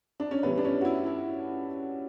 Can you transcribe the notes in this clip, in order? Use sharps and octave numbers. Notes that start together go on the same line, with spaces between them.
D4
C#4
A2 E3 G3 B3
D4
C#4
F#4
E4
E4